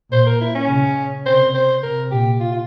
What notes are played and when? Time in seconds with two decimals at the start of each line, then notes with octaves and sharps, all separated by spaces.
0.12 A#2 C5
0.26 A#4
0.41 E4
0.55 C#4
0.69 C#3
1.26 C3 C5
1.54 C5
1.83 C3 A#4
2.11 A#2 G4
2.40 F4
2.52 F4